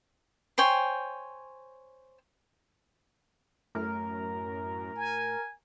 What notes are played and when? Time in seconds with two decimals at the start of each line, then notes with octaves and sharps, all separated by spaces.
0.58 C5 C#5 G5 G#5
3.75 F#2 A2 A#4
4.97 G#5